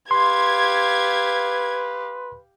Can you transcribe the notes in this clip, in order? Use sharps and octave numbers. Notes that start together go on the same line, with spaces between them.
G4 B4 F5 C6 G#6